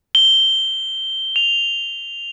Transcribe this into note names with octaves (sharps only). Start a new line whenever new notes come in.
G7
F7